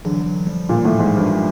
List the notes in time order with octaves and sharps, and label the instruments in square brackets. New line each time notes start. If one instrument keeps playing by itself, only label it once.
[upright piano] D3 [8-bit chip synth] E3 F#3
[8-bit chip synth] E3 F#3
F3 G3
[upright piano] A#2
A2
G#2
G2